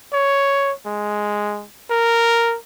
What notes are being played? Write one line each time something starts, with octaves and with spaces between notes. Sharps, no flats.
C#5
G#3
A#4